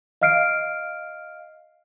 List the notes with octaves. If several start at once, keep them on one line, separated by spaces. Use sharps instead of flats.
D#5 F5 F6 C7 D7